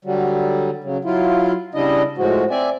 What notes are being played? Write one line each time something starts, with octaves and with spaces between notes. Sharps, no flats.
D3 F#3 G3
C#3 F#3
F#3 E4 F4
C#3 G3 D4 E4 D#5
A2 F3 G#3 F#4
C4 D5 E5 G#5